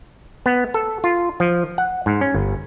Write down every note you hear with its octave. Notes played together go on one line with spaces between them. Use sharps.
B3
A4
F4
F3
F#5
G#2
C#4
G1